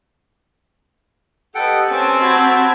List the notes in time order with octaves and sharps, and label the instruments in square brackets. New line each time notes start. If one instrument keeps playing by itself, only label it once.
[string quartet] G4 B4 D#5 [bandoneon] A4 F#5 G5
[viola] C4 [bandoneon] C#4 [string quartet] G#5 A5
[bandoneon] F#4 [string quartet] A5 B5 G#6